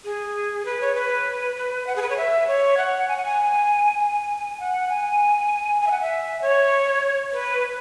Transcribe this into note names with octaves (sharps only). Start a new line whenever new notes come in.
G#4
B4
C#5
B4
B4
F#5
G#4
B4
C#5
E5
C#5
F#5
G#5
F#5
G#5
G#5
F#5
G#5
G#5
E5
F#5
E5
C#5
B4